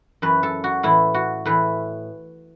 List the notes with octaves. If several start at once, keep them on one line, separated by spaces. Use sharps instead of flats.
F#2 E3 B4
A4
F#4
A2 E3 E4
F#4
A2 E3 B4